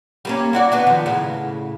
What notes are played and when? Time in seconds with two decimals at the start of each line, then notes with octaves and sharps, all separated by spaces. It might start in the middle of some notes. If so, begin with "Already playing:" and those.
0.25 G3 A#3 C#4
0.53 E4 F#4 D5
0.72 B3 D4 F#4
0.87 F#2 D#3 F3
1.06 A2 C#3